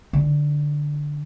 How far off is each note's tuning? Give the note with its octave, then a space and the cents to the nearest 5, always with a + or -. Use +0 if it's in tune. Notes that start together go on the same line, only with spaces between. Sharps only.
D3 +0 D#4 +40